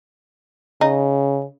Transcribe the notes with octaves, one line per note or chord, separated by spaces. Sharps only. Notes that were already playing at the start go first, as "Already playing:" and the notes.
C#3 D#4